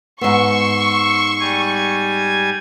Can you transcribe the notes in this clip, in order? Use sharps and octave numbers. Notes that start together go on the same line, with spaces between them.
G#2 B3 C6 C#6 E6
G3 G#5 G#6